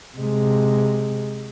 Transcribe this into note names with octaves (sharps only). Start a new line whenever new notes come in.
C3 G#3